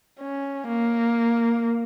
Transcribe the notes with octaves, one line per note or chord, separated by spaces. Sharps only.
C#4
A#3